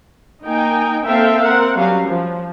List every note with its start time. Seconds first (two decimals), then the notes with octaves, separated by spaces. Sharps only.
0.45 A#3 D#4 G5 G#5
1.05 A#3 C4 A4 E5 F5 G5
1.42 C4 A#4 F#5
1.77 F#3 G3 C#4 F5
2.07 F3